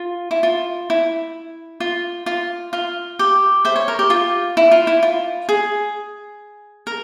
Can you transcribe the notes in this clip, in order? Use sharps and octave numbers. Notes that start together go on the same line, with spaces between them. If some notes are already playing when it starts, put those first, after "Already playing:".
Already playing: F4
E4
F4
E4
F4
F4
F4
G4
C5 E5
C#5
A#4
G4
F4
E4
F4
E4
F4
G#4
A#4